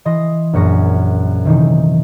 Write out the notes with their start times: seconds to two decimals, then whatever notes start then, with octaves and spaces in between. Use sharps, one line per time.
0.05 E3 D#5 C6 A#6
0.53 A#1 F#2 C#6 A#6
1.45 C3 D#3 E3 D#4